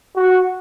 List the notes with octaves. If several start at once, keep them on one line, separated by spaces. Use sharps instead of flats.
F#4